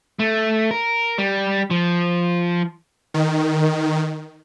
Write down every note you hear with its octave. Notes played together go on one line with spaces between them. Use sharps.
A3
A#4
G3
F3
D#3